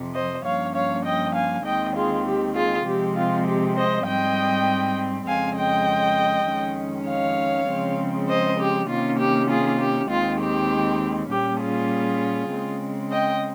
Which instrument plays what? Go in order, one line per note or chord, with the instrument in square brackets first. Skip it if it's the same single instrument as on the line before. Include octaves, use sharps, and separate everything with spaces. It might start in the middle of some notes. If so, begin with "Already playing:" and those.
Already playing: [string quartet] F2 C3 F3
C5 D#5
G2 F3 A#3 C#4 C#5 F5
C#5 F5
D#5 G5
F5 G#5
D#2 D#3 G#3 C4 D#5 G5
F4 G#4
G4
F4 G#4
C3 F3 G#3 C4 G4
F4
G4
C5 D#5
G#2 G3 C4 D#5 G5
F2 C#3 G#3 C4 F5 G#5
D#5 G5
F2 D#3 G#3 C#4
C#5 F5
C#3 F3 G#3 C4
C5 D#5
G4
C3 D#3 A#3 C#4 F4
G4
F4 G#4
G4
D#2 D#3 G#3 C4 F4
G4
A#2 G3 A#3 C#4 G4
F4 G#4
C#3 G#3 C4
D#5 G5